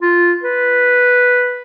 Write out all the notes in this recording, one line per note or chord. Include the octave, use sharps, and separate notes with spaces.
F4
B4